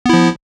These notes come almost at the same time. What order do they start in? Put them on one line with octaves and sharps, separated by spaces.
B3 E4 F3